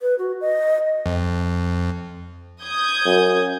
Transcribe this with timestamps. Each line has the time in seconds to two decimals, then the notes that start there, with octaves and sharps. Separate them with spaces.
0.02 B4
0.19 F#4
0.41 D#5
1.06 F2
2.63 D#6 G6 G#6
3.06 F#2